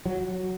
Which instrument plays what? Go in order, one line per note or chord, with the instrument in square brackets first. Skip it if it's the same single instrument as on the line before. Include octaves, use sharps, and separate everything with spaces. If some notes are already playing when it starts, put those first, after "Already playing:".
[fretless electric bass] F#3